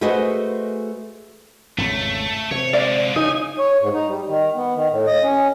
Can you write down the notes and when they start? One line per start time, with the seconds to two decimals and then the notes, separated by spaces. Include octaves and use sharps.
0.01 A3 F#4 G#4 B4 C5 D#5
1.78 G#1 E2 C#3 A3
2.51 C3 C#5
2.73 D3 G#3 D5 F5
3.16 C#3 D#4 G#5
3.59 C#5
3.81 G#2
3.93 D#4
4.07 G3
4.29 D#3
4.55 B3
4.76 D#3
4.90 A2
5.07 D#5
5.23 C#4